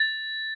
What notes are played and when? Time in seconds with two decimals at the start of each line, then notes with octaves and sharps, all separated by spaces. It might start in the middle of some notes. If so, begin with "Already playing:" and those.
Already playing: A6